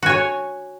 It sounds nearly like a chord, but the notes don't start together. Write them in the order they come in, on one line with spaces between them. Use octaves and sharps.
F#4 G#5 C#5